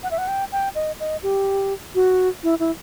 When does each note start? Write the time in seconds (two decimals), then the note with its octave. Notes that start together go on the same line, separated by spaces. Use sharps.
0.03 F#5
0.11 E5
0.18 F#5
0.28 G5
0.52 G5
0.75 D#5
1.00 D#5
1.23 G4
1.95 F#4
2.43 E4
2.60 E4